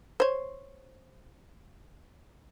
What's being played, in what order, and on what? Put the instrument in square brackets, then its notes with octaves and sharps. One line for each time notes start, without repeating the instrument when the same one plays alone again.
[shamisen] C5 C#5